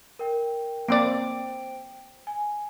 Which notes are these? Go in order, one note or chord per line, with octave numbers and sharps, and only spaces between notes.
A#4 G5
A#3 C4 C5 D5 G5 D7
G#5